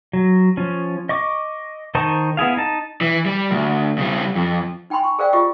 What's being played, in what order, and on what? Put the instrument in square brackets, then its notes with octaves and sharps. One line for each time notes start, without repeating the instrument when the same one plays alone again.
[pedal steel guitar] F#3
F3 C#4
D#5 C#6 D6
D#3 D#4 C5 A5 C#6
B3 E4 G#4 F5
D#4 A5
[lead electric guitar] E3
G3
D2
C#3 G3
F2
[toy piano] D#4 G5 G#5 B5 C6
C#6
G#4 A#4 C5 D5 F5 G5
F4 G4 G#4 D#5 C#6 D6